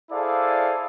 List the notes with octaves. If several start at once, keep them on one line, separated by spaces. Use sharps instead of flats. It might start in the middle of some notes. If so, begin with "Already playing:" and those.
E4 G#4 A4 C5 D5 F5